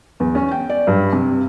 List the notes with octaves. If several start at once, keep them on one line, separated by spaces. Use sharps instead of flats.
E2
C#4
G5
D5
G2
C3